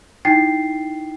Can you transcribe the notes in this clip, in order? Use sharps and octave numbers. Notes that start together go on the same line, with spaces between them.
D#4 E4 G5 A6 C7